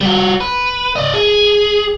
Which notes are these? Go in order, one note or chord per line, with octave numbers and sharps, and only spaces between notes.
G3 F#4
B4
D5 D#5
G#4